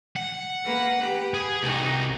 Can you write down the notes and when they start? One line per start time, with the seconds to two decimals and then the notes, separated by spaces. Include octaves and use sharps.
0.16 F#5
0.64 A#3 B4
1.00 G4 B4
1.34 G#4
1.63 C2 D#4 F#4